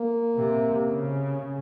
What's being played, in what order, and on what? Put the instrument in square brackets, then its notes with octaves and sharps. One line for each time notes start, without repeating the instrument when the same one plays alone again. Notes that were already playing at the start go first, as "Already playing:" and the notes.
Already playing: [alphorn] A#3
[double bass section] C3
C#3